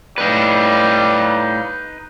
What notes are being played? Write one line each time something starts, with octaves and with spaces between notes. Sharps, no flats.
A2 G3 D#4 B4 F5